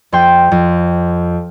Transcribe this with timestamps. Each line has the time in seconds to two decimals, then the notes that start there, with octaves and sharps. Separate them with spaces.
0.12 F2 G5 C6
0.52 F2